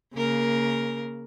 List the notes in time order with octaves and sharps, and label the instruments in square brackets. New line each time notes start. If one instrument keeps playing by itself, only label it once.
[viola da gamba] C#3 A#3 A#4